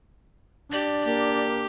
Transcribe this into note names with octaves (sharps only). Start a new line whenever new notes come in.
D4 G4 D5
A#3 G4